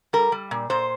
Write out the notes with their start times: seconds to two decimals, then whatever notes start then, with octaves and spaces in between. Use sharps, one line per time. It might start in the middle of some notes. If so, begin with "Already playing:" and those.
0.13 G3 A#4
0.32 G3
0.51 A#2
0.70 A#2 C5